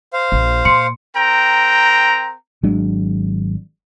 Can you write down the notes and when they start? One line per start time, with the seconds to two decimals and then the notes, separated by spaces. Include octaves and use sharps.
0.13 C5 F5
0.32 A#1
0.65 A#2 C6 C#7
1.16 C4 A#4 G5 A#5
2.63 G#1 F#3 G#3 D4